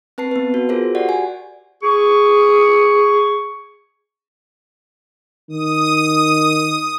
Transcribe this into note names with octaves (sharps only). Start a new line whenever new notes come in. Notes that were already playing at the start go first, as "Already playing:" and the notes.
C4 B4 A5 C7
B3 B4
F#4
F4 F#4 G#4 A#4 C5
F#4 G4 D5 F#5
G#5
G#4 C#6
D#3 D#6